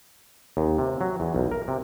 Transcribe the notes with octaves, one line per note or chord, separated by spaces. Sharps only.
D#2
C3
F#3
E2
B1
A#4
C3